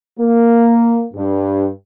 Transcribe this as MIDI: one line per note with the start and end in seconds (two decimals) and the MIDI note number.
0.17 1.03 58
1.14 1.66 43